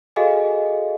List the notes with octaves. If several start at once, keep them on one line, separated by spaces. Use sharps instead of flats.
F#4 G#4 A4 D#5 F5 G#5